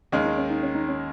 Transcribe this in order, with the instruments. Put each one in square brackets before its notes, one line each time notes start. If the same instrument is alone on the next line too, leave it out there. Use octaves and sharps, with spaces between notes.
[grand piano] D#2 D#3 G#3 [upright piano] C#4
[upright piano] D#4
C#4
D#4
C#4
D#4
C#4